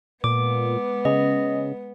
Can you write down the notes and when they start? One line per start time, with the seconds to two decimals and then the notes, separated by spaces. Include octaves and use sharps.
0.24 A#2 G#3 B3 D6
1.05 C#3 D#5